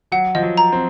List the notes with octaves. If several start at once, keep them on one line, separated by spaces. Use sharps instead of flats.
F#3 F#5
F3 D#5
F#3
A#5
C4